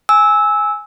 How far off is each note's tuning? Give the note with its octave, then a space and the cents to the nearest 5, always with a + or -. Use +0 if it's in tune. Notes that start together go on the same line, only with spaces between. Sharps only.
G#5 +0 E6 -15